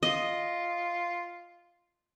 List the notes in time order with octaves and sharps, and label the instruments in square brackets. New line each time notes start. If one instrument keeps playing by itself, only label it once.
[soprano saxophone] F4 [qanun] D#5